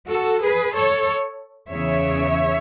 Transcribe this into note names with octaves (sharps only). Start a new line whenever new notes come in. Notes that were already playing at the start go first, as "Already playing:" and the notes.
F#4 A4
G#4 B4
A4 C#5
E2 C#3 E3 C#5 E5